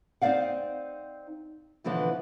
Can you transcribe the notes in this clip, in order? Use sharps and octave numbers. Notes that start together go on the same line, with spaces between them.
C4 D#4 C5 D5 F5 F#5
B2 D3 E3 F3 B3